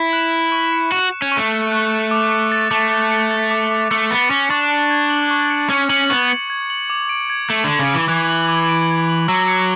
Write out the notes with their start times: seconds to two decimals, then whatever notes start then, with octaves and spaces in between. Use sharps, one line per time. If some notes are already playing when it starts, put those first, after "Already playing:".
Already playing: E4
0.13 F#6
0.32 E7
0.52 C#6
0.73 C#7
0.92 F#4 F#6
1.12 E7
1.22 C#4
1.32 C#6
1.37 A3
1.52 C#7
1.72 F#6
1.92 E7
2.11 D6
2.32 C#7
2.52 A6
2.71 A3 D6
2.91 D6
3.12 C#7
3.31 A6
3.51 D6
3.71 D6
3.91 A3 C#7
4.10 B3 A6
4.30 C#4 D6
4.50 D4 C#6
4.71 C#7
4.90 G#6
5.10 F#7
5.31 C#6
5.50 C#7
5.70 C#4 G#6
5.89 C#4 F#7
6.10 B3 C#6
6.29 C#7
6.50 G#6
6.70 F#7
6.90 D6
7.09 D7
7.30 G#6
7.50 A3 F#7
7.64 D3 D6
7.79 C#3
7.90 E3 D7
8.09 E3 G#6
8.29 F#7
8.49 D6
8.68 D7
8.89 G#6
9.09 F#7
9.28 F#3 E6
9.48 C#7